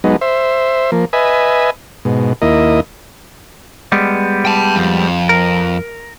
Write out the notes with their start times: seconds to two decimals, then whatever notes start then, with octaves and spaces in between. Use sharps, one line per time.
0.04 F#3 G#3 B3 D#4
0.21 C5 E5
0.92 F3 A#3
1.13 B4 D#5 E5 G#5
2.05 G#2 B2
2.42 D#2 A#3 E4 D#5
3.92 G3 G#3 B3
4.45 G5 A5
4.76 F2
5.29 A#4